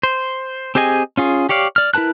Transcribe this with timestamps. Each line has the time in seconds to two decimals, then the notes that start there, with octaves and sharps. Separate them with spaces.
0.03 C5
0.75 C4 G4 G#4 D#5 G#5
1.17 C#4 F4 G#4
1.49 G4 C#5 D5 F5
1.76 D5 F6
1.94 E4 A#4 B4 A5 F#6